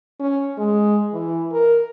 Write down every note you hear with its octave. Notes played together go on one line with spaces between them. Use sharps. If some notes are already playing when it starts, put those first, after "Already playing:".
C#4
G#3
E3
A#4